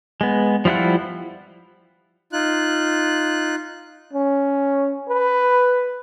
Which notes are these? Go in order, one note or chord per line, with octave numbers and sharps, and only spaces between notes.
G#3 B3
F3 G3 E4 F4 F#5
D#4 F4 F#6
C#4
B4